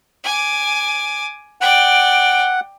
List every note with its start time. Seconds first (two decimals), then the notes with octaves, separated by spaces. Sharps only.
0.24 G#5 D6
1.61 D5 F#5 G5